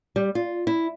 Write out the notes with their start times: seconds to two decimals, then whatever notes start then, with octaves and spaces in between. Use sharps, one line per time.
0.16 G3
0.35 F4
0.67 E4